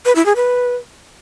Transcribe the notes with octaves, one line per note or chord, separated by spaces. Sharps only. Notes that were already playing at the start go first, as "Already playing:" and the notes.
B4
E4
G#4
B4